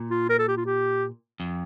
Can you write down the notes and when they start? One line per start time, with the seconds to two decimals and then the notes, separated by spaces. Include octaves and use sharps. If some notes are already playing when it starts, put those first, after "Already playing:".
Already playing: A#2
0.11 F4
0.29 A#4
0.39 A4
0.48 G4
0.57 F4
0.66 G4
1.40 F2